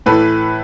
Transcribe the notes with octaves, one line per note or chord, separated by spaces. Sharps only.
A2 E3 A4 B4